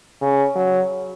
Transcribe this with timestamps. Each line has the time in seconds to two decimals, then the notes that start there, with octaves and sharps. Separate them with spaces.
0.21 C#3
0.56 F#3